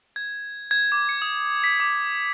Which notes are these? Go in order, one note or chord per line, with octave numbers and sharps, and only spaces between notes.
G#6
G#6
D6
C#7
D#6
B6
D6